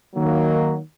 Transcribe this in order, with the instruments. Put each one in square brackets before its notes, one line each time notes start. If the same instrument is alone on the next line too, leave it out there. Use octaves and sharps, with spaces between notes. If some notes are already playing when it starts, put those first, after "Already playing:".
[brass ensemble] D#3 F#3 A#3